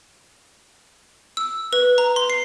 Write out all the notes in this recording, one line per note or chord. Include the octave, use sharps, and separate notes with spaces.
E6
B4
A#5
C6
C7